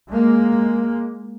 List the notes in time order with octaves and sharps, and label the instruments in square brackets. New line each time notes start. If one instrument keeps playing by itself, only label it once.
[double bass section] G#3 A#3